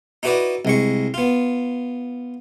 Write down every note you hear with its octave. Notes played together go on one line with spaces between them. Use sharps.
D#4 E4 F#4 B4 D5 D#5
C2 G#3 C#6
B3 F4